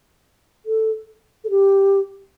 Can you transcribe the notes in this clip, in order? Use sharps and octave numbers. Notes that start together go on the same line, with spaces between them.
A4
A4
G4